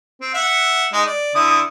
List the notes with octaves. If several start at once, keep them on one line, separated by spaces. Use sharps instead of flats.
C4
E5 F#5
G#3 D#4
D5
D3 E4 D#6